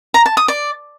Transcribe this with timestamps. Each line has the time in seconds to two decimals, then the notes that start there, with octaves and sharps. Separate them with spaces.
0.14 A#5
0.26 A5
0.37 D#6
0.48 D5